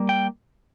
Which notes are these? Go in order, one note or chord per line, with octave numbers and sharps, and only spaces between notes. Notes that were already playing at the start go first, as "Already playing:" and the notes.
Already playing: G3 A#3
G5